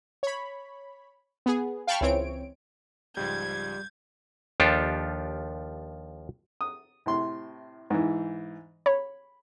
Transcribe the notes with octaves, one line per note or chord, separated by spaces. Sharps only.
C#5 B5
B3 G#4
F5 G5 A5 B5 C#6 F6
C#2 E3 C4 C#5 D7
C#2 G#2 F3 G3 G6 G#6
D#2 F3 D4 F4 G4 A4
D#6
A2 C3 C6
G#2 E3
C#5 B5